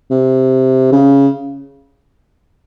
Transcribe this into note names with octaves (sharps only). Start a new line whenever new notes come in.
C3
C#3